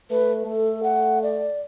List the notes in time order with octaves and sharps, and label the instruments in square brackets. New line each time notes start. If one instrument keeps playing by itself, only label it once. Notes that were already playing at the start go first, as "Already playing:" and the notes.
[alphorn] A3 [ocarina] B4
[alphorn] A3 [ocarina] A4
[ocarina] F#5
D5